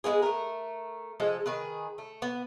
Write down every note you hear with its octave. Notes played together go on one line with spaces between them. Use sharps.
G#3 A#3 B3 G#4
A3 A#4
F3 G#3 A4
D#3 G#4 B4
A3
B3